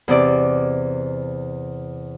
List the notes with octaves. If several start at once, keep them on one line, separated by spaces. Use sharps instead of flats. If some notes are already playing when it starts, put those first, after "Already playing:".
E2 C3 D5 D6